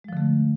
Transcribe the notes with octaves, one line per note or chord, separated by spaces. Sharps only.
D3 F3 G#3 A3